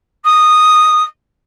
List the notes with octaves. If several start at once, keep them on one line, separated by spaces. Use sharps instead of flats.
D#6